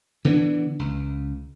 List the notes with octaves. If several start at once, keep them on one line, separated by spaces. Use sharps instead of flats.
D3 E3 B3 D4
C#2